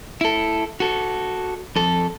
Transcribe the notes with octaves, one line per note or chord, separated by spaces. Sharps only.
E4 A4
F#4 A4
F2 A4